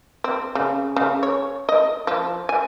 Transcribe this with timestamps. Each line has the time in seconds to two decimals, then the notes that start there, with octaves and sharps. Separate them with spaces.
0.24 C4
0.55 C#3
0.96 C#3
1.23 C#5
1.69 D#5
2.07 F3
2.49 G#5